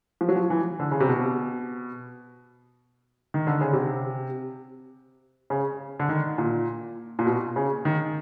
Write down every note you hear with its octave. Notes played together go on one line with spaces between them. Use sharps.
F3
F#3
F3
E3
D3
C#3
C3
B2
D#3
D3
C#3
C3
C#3
D3
D#3
A#2
A#2
B2
C#3
D#3